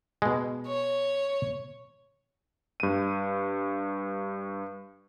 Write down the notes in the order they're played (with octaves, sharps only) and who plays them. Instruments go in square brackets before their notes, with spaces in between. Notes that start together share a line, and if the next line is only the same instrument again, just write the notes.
[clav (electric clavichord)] B2 G#3
[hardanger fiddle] C#5
[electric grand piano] G2 D#7